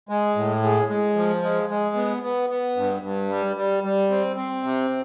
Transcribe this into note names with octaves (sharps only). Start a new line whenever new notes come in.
G#3
A2
G#3
G#3
F3
G#3
G#3
B3
B3
B3
G2
G2
G3
G3
G3
C4
C4
C3